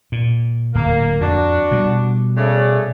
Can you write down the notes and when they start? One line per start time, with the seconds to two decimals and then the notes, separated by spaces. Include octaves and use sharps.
0.12 A#2
0.75 D1 A#3
1.21 F2 D4 F#4
1.71 B2 G3
2.36 C#3 A3 D5